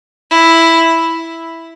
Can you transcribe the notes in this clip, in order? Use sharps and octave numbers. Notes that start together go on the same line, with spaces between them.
E4